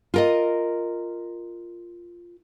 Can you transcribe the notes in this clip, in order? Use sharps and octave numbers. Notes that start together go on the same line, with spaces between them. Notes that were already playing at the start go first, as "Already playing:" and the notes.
F4 A#4 D#5